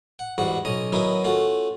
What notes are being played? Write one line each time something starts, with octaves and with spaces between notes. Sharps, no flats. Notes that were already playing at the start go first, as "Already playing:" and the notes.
F#5
E2 G#2 G3 F#4 F#5
B1 C#4 D#5 A#5
D#3 F#3 B3 C#4 D#4 E4
A3 C#4 F4 F#4